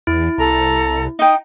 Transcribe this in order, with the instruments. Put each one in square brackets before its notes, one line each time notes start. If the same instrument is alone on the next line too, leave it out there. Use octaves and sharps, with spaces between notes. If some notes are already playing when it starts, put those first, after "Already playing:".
[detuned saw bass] E2 [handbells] E4
[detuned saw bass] C2 [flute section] A4 A#5
[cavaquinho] D#4 G5 [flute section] D#6